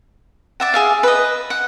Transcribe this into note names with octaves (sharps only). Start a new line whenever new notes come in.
D5 E5 F#5
G#4 E5 F5
B4 D#5
F#5